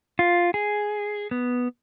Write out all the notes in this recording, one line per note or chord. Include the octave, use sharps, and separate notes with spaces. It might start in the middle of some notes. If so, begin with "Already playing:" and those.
F4
G#4
B3